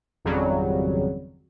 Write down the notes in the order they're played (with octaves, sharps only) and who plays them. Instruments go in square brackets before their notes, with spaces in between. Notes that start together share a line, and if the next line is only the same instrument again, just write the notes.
[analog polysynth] G#1 F2 C#3 F#3 G3